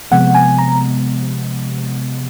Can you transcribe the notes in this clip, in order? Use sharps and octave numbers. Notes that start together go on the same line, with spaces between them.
C3 F3 G#3 B3 F#5
G#5
A#5